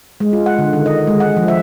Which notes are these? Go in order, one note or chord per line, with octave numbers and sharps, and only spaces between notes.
G#3
F4
F#5
D3
D#3
D#5
G#3
F#5
F3
E5